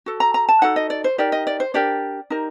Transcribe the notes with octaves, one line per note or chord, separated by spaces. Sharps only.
F#4 A4
A#5
A#5
A5
D#4 F#4 A4 F#5
D#5
D5
C5
D#4 G4 A#4 D5
D#5
D5
C5
D4 G4 A#4 D5
D#4 G4 A#4